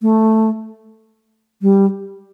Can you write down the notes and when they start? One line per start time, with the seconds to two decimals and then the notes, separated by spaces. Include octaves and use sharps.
0.02 A3
1.62 G3